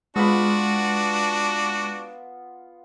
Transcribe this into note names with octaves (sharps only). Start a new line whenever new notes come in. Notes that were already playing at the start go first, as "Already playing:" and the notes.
G#3 B3 D4 F4 F#4 B5